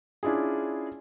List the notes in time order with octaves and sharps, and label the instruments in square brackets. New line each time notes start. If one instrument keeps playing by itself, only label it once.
[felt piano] C#4 D4 E4 F4 G#4